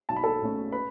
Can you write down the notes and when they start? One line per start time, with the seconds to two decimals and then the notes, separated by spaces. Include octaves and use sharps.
0.09 B1 A5
0.16 B5
0.24 A4 A5
0.41 B2 A3 C#4
0.72 B4 B5